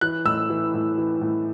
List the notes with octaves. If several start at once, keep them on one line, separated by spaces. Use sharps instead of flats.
E3 F#6
A2 E6
E3
A2
E3
A2